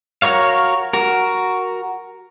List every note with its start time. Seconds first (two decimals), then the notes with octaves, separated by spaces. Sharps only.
0.22 F#4 A#4 C#5 F5
0.93 F#4 A#4